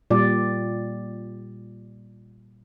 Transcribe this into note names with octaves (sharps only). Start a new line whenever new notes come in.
A#2 G3 D5